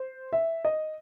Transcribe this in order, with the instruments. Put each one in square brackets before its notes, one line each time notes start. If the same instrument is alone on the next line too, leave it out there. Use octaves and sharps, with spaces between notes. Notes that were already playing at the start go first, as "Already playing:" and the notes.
Already playing: [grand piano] C5
E5
D#5